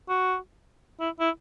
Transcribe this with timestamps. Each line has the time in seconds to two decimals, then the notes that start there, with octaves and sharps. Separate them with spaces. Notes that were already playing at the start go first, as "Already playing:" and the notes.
0.09 F#4
1.00 E4
1.20 E4